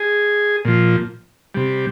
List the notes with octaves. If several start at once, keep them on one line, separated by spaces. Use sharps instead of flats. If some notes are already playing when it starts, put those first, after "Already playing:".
Already playing: G#4
A#2 F3
C3 G3